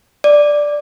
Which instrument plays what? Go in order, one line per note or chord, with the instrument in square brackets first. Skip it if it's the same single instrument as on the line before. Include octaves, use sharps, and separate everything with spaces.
[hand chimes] D5